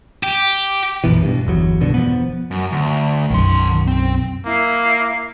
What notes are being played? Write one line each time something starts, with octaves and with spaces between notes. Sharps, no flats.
G4
A#1 F#2 B2 E3
G2 B2
G1 E2 F#3
B1 G2 B2 D3
E1 F3 B3
F#2
D2
B1 F#2 D#3 C6
C4
A#3 E4 F5